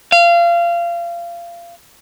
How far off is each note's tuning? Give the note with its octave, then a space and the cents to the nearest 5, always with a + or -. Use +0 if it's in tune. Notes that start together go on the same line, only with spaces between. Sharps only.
F5 -25